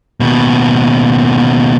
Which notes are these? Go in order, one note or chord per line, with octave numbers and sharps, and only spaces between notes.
D#2 B2